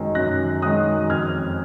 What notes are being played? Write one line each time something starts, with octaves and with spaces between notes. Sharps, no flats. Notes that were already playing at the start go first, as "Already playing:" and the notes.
Already playing: F#2 D#3 G#3
F#2 F#6 A#6
D#3 G#3 D#6 F#6
F2 F6 G#6